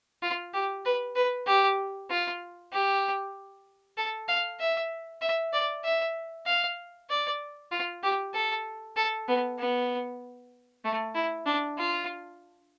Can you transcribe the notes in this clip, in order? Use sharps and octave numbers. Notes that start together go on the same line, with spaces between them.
F4
G4
B4
B4
G4
F4
G4
A4
F5
E5
E5
D5
E5
F5
D5
F4
G4
A4
A4
B3
B3
A3
E4
D4
F4